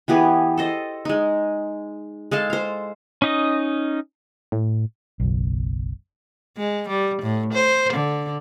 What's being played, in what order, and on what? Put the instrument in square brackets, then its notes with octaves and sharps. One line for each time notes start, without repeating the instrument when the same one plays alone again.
[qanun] E3 B3 G4 G#4
A4 C5 D#5
G#3 D#4
G#3 A4 F5 A5
C5 F5
[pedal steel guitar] C#4 D#4 D#5
[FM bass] A2
[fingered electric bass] F#1 B1
[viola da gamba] G#3
G3
A2
C5
D3